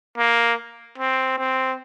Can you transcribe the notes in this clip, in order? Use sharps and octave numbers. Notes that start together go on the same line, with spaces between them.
A#3
C4
C4